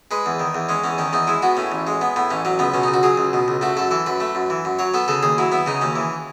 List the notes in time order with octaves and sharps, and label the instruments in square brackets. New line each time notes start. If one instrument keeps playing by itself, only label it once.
[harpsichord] G#3 B4
E2
D#3
E2
G#3 C#4
E2 C#4
D#3 C#4
E2 D#4
G#3 E4
B3 F#4
A2 C#4
A1
G#3
B3
A2 B3
A1 C#4
F#3 C#4
C#2 B3
B2 C#4
C#2 D#4
F#4
F#3 G#4
C#2
B2
C#2
A3 F#4
F#2 A4
E3 A4
F#2 B4
A3
F#2
E3
F#2
F#3 C#5
B3 A4
C#3 A4
D#2 G#4
F#3 E4
B3 E4
C#3 D#4
D#2 C#4
E3